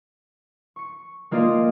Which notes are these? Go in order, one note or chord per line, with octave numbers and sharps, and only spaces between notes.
C#6 C#7
G#3 A#3 F4 D5 D#5 F5